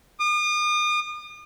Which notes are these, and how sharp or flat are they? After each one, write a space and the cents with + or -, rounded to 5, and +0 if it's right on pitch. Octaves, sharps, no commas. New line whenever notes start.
D#6 -40